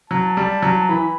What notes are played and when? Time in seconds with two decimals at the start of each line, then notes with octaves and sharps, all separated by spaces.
0.10 F#3 A5
0.37 G3
0.63 F#3
0.89 E3 B5